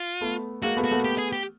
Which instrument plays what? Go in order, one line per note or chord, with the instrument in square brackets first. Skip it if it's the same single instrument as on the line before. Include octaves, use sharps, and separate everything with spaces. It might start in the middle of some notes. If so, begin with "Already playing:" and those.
Already playing: [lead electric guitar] F4
[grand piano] A3 B3
[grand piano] G#3 A#3 [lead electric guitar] F#4
[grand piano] A3 B3
[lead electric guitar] F#4
[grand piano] A3 B3
[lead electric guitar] G4
G#4
G4